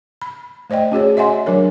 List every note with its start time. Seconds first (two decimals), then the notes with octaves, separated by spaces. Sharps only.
0.22 B5
0.70 A3 C5 D5 D#5 G5
0.92 C#4 F#4 G#4 C#5
1.17 D#5 E5 F#5 G#5 C6
1.46 F#3 D4 A#4 C#5